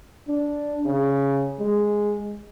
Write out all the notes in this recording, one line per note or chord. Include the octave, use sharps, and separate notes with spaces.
D4
C#3
G#3